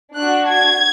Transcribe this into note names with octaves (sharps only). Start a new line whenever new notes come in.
D4 F#4 F#6
G#6